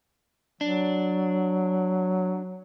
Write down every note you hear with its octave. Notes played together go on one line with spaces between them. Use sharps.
F#3 D4